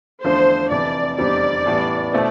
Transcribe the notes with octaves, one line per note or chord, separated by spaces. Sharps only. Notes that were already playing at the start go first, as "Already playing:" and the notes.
E2 D3 F3 A3 D4 C5
F1 F2 C3 E3 D5
F1 E2 D3 G3 C4 D5
A1 A2 E3 G3 B3
B2 A3 C4 E4